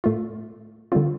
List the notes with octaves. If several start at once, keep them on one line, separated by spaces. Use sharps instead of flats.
A2 A3 F4
D3 G3 C4 F4